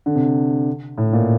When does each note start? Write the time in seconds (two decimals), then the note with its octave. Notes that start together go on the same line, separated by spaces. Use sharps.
0.06 D3
0.15 C3
0.98 A2
1.13 A#2